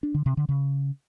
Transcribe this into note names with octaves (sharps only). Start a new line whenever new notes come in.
D4
D3
C3
D3
C#3